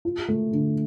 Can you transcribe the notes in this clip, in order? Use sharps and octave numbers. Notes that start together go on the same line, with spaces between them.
F4
A3
D3